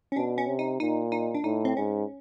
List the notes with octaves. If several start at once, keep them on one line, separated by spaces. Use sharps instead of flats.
C#4
B2 D4
C#4
C3
D#4
A#2 D#4
D#4
D4
A2 D#4
C4
G#2 C#4